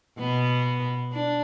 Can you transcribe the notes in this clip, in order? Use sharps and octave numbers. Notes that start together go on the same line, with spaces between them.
B2 B3
D4